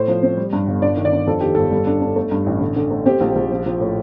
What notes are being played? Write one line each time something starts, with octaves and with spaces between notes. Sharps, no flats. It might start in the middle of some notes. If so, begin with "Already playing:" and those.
Already playing: A2 C5
F3
C4
G3
G2
G1
D4 D5
D#3
D5
D4
F2 A4
D#3 G4
G1 A4
G3
D4
D4
A3
G2
A1
D3
D3
A3
C4 G4
A#1
A#1
F3
F3
A2